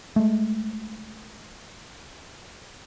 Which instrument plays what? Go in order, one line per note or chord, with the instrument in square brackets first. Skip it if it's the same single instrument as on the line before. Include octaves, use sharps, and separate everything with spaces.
[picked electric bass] G#3 A3